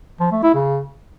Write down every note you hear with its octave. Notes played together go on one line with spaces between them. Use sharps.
F3
A3
E4
C#3